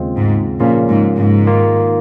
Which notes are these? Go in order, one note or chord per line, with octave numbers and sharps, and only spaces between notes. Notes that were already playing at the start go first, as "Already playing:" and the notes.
Already playing: D#2 C#3 G#3 C4 F4
G#2
A#2 C#3 F3 A#3 C#4 F4
G#2
G#2
D#3 A#3 F4